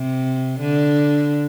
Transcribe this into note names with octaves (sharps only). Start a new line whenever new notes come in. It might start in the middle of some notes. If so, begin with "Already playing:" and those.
Already playing: C3
D3